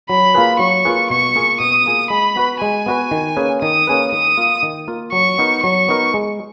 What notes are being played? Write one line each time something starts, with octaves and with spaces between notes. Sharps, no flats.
F#3 B5
A#3 F4 G#4 B4
F#3 C#6
A#3 F4 G#4 B4
B2 C#6
A#3 F4 G#4
B2 D#6
A#3 F4 G#4
G#3 B5
B3 F#4 B4
G#3 G#5
B3 F#4 B4
D#3
A#3 C#4 G#4 B4
D#3 D#6
A#3 C#4 G#4 B4
D#3 D#6
A#3 F4
D#3
A#3 F4
F#3 C#6
B3 D#4 A#4
F#3 C#6
B3 D#4 A#4
G#3